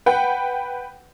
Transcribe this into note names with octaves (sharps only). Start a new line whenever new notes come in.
B4 F#5 G5